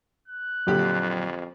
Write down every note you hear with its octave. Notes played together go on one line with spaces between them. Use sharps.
F#6
F2 A#2 D3 F#3 G4